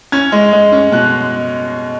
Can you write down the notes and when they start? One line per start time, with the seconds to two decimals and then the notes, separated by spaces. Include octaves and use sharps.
0.12 C#4 G#6
0.32 G#3
0.53 G#3
0.72 C#4
0.92 B2 F#6